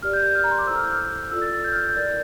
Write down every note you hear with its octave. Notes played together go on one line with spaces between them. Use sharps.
G4 A#4 D5 F6
G6
G6
F6
A#5
C6
D6
E4 A4 C5 E6
F6
G6
F6
F4 A4 D5 E6
A6
A6
G6
F6
G6
E4 A#4 D5 A6
G6